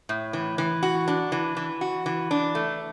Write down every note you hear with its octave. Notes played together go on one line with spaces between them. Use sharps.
A2
E3
E3
F#4
D4
E3
E3
F#4
E3
D4
A3